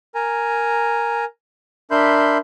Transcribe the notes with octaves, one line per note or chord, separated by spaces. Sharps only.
A#4 G#5 A#5
D4 A#4 E5 B5 C6 G6